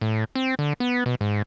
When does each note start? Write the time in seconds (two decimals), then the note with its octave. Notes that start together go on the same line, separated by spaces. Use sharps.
0.01 A2
0.35 C4
0.59 D3
0.80 B3
1.06 B2
1.21 G#2